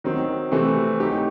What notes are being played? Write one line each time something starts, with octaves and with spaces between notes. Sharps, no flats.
D#3 F#3 C4
C3 E3 A3 C4
F#3 A3 D#4 G4